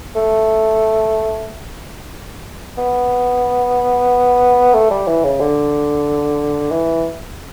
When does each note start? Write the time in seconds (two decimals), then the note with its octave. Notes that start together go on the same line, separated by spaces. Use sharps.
0.15 A3
2.78 B3
4.74 A3
4.91 G3
5.07 E3
5.24 C#3
5.40 D3
6.71 E3